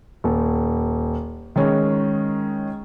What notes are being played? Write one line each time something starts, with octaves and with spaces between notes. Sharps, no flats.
D#1
D#3 G#3 C#4